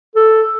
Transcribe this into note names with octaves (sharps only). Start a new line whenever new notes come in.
A4